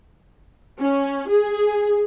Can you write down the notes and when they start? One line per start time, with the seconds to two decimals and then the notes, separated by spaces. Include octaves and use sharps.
0.81 C#4
1.29 G#4